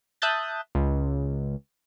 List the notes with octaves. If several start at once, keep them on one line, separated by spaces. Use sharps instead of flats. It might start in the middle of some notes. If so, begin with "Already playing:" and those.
E5 A5 D#6 F#6 G6 A6
C#2